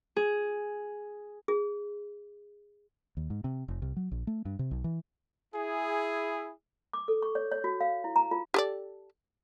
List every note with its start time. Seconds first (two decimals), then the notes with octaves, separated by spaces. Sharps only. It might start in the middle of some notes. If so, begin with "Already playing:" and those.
0.16 G#4
1.48 G#4
3.17 D#2
3.30 G#2
3.44 C3
3.68 F1
3.82 C2
3.97 F#3
4.11 A#1
4.27 A3
4.45 G2
4.59 C3
4.71 B1
4.84 E3
5.54 E4 G#4
6.93 D6
7.08 A4
7.22 C#6
7.35 C#5
7.52 C#5
7.64 F#4
7.81 F5
8.04 E4
8.16 A#5
8.31 F4
8.54 G4 A4 D5